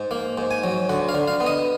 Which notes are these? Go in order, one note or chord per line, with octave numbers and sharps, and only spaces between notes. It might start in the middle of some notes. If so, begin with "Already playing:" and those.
Already playing: G#2
A#3
G#2
G#5
F#3
D2 F#5
F5
D3
F5
B3
D#5